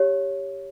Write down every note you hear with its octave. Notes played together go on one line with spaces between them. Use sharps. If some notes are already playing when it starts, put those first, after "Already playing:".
Already playing: G4 C#5